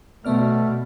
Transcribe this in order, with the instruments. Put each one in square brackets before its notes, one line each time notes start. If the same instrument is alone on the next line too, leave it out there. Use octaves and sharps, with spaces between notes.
[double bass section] B2 [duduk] A3 [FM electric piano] B3 D5 F6